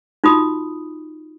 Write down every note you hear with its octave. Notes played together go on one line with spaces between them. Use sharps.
D#4 F4 F#4 B5 D#6